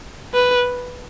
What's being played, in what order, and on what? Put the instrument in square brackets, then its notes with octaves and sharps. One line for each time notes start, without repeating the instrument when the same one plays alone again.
[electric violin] B4